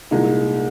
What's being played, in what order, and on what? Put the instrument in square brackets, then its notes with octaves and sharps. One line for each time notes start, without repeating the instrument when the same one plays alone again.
[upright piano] C2 A#2 G#3 D#4